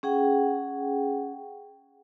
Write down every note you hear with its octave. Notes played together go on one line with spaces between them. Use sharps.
C#4 G#4 F#5 G5